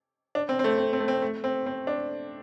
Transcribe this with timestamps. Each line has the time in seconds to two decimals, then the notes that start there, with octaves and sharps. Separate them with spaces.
0.35 D4
0.49 C4
0.59 C4
0.64 A3
0.78 C4
0.93 C4
1.00 A3
1.08 C4
1.22 A3
1.44 C4
1.66 C4
1.87 D4